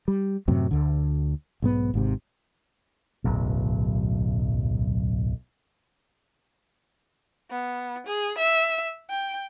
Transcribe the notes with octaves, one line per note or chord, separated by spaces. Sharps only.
G3
F#2 A2 C3 F#3
D2 D3
B1 G#2 B3
G#1 G#2 C3
D1 B1 F#2
B3
G#4
E5
G5